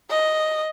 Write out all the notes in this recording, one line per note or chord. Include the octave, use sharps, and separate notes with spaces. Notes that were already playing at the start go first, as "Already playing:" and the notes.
D#5